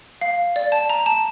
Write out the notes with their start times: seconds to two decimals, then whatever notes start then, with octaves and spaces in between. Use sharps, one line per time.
0.21 F5
0.56 D5
0.72 A5
0.90 A#5
1.06 A5